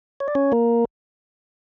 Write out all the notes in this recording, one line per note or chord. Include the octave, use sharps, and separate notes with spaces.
C#5
D5
C#4 C#5
A#3 A#4